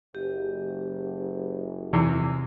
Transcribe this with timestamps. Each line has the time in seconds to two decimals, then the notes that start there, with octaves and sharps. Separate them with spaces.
0.15 F#1 G4
1.93 E2 C3 E3